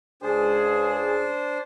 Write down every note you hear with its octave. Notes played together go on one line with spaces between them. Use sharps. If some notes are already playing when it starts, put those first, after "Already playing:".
C#2 D4 G#4 C5